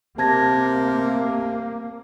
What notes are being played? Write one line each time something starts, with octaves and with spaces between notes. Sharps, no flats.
C3 A#3 A5 G#6 A#6